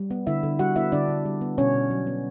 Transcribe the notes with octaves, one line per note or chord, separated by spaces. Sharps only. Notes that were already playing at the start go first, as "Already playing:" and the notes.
Already playing: G3
B3
D3 E4 E5
D3
G3 F#4 F#5
B3 E4 E5
D3 D4 D5
D3
G3
B3
B2 C#4 C#5
B2
F#3
B3